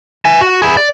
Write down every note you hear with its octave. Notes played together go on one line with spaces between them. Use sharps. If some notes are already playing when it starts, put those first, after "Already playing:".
E5 G#5
F#4
E4 G#4
D5